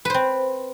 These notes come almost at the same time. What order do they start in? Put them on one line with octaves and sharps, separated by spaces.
B4 C5 C4